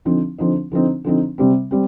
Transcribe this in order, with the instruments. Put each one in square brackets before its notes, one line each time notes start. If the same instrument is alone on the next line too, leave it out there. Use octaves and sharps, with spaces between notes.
[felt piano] D3 F3 C4 D#4
D3 F3 C4 D#4
D3 F3 C4 D#4
D3 F3 C4 D#4
C3 G3 C4
G3 C4